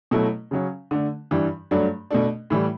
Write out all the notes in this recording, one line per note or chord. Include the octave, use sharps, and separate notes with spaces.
B2 F#3 A3 E4
C#3 F#3 C#4
D3 A3 D4
G2 E3 G3 D4
G2 F#3 A3 D4
B2 A3 D4
A2 E3 G3